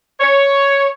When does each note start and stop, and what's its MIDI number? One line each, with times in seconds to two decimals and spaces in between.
0.20 0.88 73